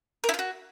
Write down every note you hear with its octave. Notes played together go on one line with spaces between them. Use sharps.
A#4
E4
F4
F#4